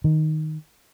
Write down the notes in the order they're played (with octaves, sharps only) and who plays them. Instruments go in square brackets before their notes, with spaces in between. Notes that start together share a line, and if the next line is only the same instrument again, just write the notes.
[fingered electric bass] D#3